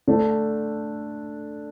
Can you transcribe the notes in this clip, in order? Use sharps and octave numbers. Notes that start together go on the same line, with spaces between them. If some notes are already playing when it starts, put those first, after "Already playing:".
D3 A3 D4